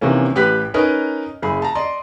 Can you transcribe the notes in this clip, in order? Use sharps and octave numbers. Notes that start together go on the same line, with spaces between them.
C3 D#3 E3 A#3 C#4
A1 G4 B4 F#6 B6
C#4 D#4 A#4 B4 D#5
F#1 G#4 B5
A5 A#5
D5 D#5 C6